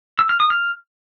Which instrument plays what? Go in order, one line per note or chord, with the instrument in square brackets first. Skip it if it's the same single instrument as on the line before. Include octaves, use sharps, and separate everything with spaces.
[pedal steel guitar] E6
F6
D#6
F6